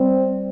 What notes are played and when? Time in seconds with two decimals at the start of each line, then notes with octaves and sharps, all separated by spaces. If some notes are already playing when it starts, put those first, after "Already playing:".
Already playing: G3 C4